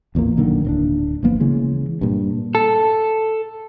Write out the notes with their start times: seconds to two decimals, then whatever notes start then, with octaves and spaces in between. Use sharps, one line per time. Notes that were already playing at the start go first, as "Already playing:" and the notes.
0.15 A1 E2 A#2 A#3
0.37 B1 A#2 D3 D#3
0.65 D1 C4 D4
1.23 G1 F3 A#3 B3
1.40 C#3 E3 G#3
2.01 G2 A#2
2.55 A4